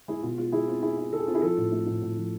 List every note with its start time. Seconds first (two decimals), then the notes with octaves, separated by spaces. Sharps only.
0.08 G#3 E4 G#4
0.22 B2 F4
0.38 G#3 F4
0.52 G#3 E4 G#4
0.67 C4 F4
0.82 E4 G#4
0.98 E4
1.13 E4 A4
1.19 G#4
1.27 C4 F4
1.35 E4 G#4
1.42 F3 F4 A4
1.57 A2
1.72 A3
1.86 A2
2.02 A2
2.17 F3